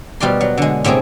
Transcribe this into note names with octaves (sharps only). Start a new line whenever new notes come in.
B2 G3 F4 D5 C6
F#3
D3 G#3
A2 C3 A#3 C4 G#4